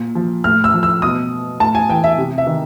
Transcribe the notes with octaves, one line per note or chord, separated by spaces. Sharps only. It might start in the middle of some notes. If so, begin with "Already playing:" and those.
Already playing: A#2
F3
A2 F6
E6
F3
E6
B2 D#6
A2 A5
G#5
E3 G5
E5
C3
E5
D#3